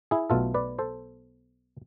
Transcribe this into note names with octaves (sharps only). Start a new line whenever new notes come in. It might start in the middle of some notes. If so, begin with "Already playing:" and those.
E4 G#4
B1 B2 A3 F4 A4
B4 D5
A4 C5